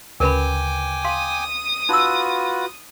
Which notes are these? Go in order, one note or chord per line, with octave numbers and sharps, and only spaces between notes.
D2 C#3 A#4 B4 G5 G#5 B5 D6
F5 C6 D#6
D#4 F4 F#4 B4 E6